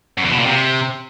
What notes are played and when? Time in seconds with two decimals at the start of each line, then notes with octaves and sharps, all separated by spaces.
0.18 F#2
0.25 E2
0.32 B2
0.39 A#2
0.46 C3